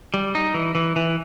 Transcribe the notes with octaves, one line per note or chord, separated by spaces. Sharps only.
G3
D#4
E3
E3
E3